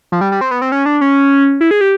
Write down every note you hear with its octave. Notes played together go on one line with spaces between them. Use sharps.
F3
G3
G3
C4
B3
C4
C#4
D4
C#4
E4
G#4
G4